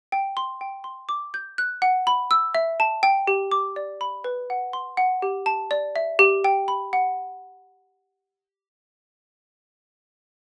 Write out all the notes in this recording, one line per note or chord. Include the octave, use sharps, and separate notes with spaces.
G5
C6
G5
C6
D6
G6
F#6
F#5
B5
E6
E5
A5
G5
G4
D6
D5
B5
B4
F#5
C6
F#5
G4
A5
D5
E5
G4
G5
B5
F#5